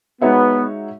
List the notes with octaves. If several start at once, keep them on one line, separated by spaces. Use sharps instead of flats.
G#3 B3 D#4 F#4 C#5 E5